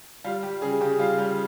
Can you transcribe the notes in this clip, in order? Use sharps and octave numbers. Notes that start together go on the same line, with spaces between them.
G3 F4
G3 G4
C#3 G#4
C#3 G4
G3 F4
G3